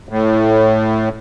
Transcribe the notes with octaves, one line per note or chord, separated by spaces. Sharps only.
A2